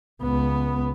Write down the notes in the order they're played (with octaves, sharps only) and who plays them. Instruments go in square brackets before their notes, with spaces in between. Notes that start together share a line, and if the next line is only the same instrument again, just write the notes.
[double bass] C#2 B3